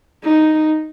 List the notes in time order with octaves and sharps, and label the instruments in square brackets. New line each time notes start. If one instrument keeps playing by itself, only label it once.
[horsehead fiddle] D#4